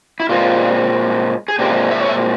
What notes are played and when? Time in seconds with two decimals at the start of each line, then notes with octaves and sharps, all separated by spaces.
0.20 E4
0.29 A#2 G#3 C4 F4
1.48 G#4
1.59 A#2 G#3 C4 G4
1.91 E5
2.01 C#5
2.09 E5